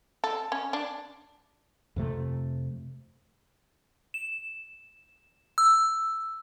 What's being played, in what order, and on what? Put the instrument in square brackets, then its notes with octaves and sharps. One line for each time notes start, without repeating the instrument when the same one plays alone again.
[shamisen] A4
C#4
D4
[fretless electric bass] F2 C3 A3
[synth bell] E7
E6